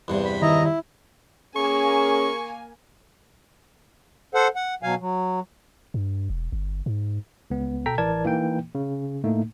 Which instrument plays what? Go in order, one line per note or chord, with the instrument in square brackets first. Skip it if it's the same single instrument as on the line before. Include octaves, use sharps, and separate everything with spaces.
[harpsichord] E2 G2 C3
[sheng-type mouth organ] B5
[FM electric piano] D#3 [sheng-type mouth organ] E4 D#5 A#5
[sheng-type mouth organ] E4
[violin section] A#3 G#5 [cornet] C#4 [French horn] G#4 [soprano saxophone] C#6
[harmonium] A4 C5 F#5
F#5
B2 F#3 F5 G#5
F#3
[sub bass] G2
E1
G1
G#2
[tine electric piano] C#2 B3
B2 A4 G5 A#5 B6
A1 E3 A#4 D5 A5 G#6
E3 A#3 D#4 G5
C#3
A2 A3 A#3 D#4